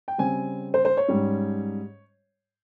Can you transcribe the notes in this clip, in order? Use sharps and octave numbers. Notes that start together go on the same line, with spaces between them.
G5
C#3 G3 C4 G#5
C5
C5
C#5
G#2 G3 C#4